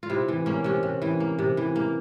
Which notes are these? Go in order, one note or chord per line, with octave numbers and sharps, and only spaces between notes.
F4
C3 E4
E3
A#3 C#4
C3 C#4
C3
E3
A#3
C3
E3
A#3